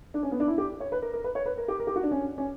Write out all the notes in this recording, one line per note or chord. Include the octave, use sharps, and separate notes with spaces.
D4
C#4
B3
D4
E4
G4
C#5
B4
A#4
A#4
B4
C#5
B4
A#4
G4
A#4
G4
F#4
D4
C#4
C#4